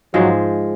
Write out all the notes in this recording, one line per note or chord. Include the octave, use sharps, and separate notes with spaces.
G#2 F3 F#3 G#3